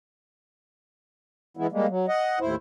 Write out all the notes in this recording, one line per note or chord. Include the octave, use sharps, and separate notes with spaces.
E3 G#3 B3 E4
G3 G#3 A#3
F#3
D#5 F#5
D#2 A2 E4 C5